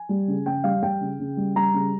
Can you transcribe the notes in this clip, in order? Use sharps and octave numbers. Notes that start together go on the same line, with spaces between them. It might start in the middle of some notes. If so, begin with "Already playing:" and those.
Already playing: G#5
G3
C#3
C#3 G5
G3 F5
G3 G5
C#3
C#3
G3
G3 A#5
C#3